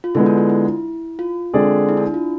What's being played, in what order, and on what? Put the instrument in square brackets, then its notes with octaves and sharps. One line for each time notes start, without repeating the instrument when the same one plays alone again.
[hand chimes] F4
[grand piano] D3 G#3 B3 [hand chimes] E4
[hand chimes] D4
F4
E4
F4
[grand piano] D3 G#3 C4 G#4 D5
[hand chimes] E4
D4
E4
F4